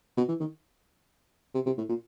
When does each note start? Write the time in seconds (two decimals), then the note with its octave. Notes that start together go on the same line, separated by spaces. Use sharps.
0.17 B2
0.28 E3
0.40 D#3
1.54 C3
1.66 C3
1.78 A2
1.89 A#2